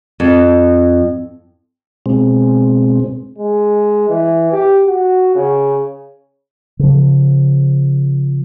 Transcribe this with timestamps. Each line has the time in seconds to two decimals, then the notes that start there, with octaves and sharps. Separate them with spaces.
0.20 F2
2.06 B2 G#3 C4
3.38 G#3
4.09 E3
4.53 G4
4.87 F#4
5.35 C#3
6.79 C#3 F3